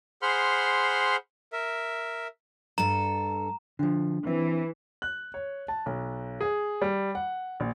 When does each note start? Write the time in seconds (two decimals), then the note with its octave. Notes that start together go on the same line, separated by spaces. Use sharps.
0.22 G#4 C5 F#5 B5 C6 F6
1.53 A#4 E5
2.78 G2 A4 A#5
3.79 D3 F3 D4
4.27 E3 C4
5.02 F#6
5.34 C#5
5.68 A5
5.86 B1
6.41 G#4
6.82 G3
7.15 F#5
7.60 A#1